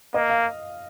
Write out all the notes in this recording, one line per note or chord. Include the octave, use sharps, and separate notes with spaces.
A#3 D#5
F5